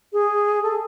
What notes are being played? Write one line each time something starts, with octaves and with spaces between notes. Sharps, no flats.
G#4
A4